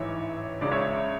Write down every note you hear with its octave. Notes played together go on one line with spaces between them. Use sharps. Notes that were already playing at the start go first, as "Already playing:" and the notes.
Already playing: A1 G#2 E3 C#5 E5
C#2 C#3 G#3 D5
C#5 E5